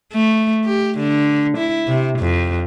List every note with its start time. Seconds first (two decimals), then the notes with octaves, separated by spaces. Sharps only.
0.13 A3
0.65 G4
0.98 D3
1.58 E4
1.88 C3
2.20 F2